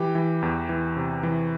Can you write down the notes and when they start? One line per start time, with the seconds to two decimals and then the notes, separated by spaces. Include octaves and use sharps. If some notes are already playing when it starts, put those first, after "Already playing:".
Already playing: E3 G4 G5
0.15 E3
0.42 E2
0.69 E3
0.96 C3
1.23 E3